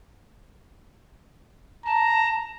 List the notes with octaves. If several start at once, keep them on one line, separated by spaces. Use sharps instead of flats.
A5 A#5